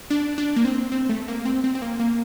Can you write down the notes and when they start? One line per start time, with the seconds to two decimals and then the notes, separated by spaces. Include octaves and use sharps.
0.10 D4
0.38 D4
0.56 A#3
0.65 C4
0.92 C4
1.09 A3
1.28 A#3
1.45 C4
1.64 C4
1.75 C4
1.82 A#3
1.99 A#3